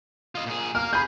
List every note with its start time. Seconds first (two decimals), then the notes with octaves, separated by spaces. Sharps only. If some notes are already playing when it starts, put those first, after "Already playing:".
0.35 F4 D#5
0.46 A#2 G#4
0.75 A#4 F5 F6
0.93 G#4 B5 G6